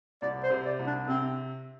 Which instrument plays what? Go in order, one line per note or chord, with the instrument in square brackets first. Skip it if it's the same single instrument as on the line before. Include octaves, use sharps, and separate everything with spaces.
[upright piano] C2 [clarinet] D5
[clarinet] C5
[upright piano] C3
[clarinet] D5
[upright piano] C2
[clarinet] D4
[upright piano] C3 [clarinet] C4